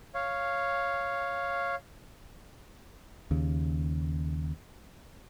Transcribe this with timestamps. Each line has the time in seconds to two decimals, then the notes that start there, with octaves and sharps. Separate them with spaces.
0.14 C#5 F5
3.31 D#2 C#3